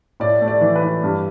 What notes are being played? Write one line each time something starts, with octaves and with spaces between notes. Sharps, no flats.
A2 D5
A3
D5
E3
B4
E3
G2